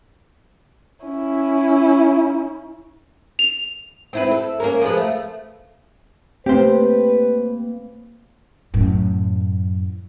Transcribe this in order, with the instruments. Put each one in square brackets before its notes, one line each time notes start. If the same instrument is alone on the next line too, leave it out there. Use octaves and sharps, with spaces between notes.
[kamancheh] C#4 E4
[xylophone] F7
[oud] C4 E4 B4
A4
A#3 C#4 A#4
F3 G#3 B4
A3
[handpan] A3 C4 [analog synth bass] A#3 [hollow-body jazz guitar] G4 C5 [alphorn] B4
[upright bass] F#2 A2